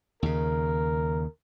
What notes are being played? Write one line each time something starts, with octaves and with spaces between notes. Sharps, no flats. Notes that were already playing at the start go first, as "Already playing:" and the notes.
D#2 C#3 A#4